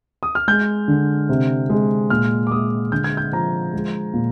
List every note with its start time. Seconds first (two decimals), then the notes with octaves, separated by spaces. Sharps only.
0.23 D#6
0.35 F6
0.48 G#3 G6
0.88 D3
1.29 C3
1.70 G#3
2.10 A#2 F6
2.47 D6
2.51 G#3 D#6
2.92 D3 G6
3.04 G#6
3.17 G6
3.32 F3 A#5
3.74 G#3
4.14 A#2